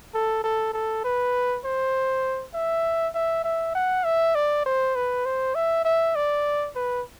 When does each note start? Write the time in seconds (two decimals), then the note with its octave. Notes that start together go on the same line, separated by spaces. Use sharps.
0.14 A4
0.44 A4
0.73 A4
1.04 B4
1.64 C5
2.54 E5
3.15 E5
3.44 E5
3.75 F#5
4.05 E5
4.35 D5
4.66 C5
4.95 B4
5.25 C5
5.55 E5
5.85 E5
6.15 D5
6.75 B4